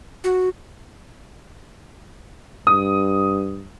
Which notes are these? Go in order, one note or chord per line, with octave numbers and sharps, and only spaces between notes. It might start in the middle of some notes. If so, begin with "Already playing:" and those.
F#4
G2 D#6